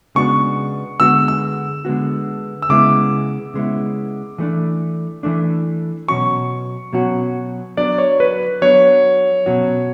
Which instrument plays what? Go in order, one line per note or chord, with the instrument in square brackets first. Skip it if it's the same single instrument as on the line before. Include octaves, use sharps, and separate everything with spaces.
[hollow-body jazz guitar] C#3 G#3 B3 D4 F#4 [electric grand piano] C#6
[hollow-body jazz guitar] D3 G#3 B3 F#4 [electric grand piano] E6
[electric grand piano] E6
[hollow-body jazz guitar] D3 G#3 B3 F#4
[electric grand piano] E6
[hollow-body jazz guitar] C#3 G#3 B3 E4 [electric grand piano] D6
[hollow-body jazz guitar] C#3 G#3 B3 E4
E3 A3 D4
E3 A3 D4
[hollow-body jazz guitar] B2 F#3 C#4 F#4 [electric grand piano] C#6
[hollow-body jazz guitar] B2 F#3 C#4 F#4
[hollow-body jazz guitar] F#3 B3 D4 [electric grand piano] D5
[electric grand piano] C#5
B4
[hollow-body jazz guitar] F#3 B3 D4 [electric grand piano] C#5
[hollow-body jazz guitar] B2 F#3 C#4 F#4